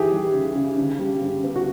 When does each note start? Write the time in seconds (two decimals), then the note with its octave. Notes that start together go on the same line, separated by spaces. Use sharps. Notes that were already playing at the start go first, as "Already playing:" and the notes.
Already playing: D#3 E3 G4 G#4
0.12 G3
0.34 C#3
0.55 C#3
0.78 D3
0.99 G3
1.22 G2
1.44 B3
1.56 F#4